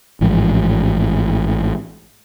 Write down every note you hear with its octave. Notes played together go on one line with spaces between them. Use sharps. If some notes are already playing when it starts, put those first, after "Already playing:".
A1 G#2 F3